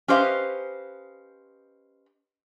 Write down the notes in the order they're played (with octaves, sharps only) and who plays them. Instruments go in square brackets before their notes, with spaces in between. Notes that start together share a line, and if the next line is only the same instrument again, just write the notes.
[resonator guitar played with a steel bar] C#4 G4 B4 C5 D#5 F5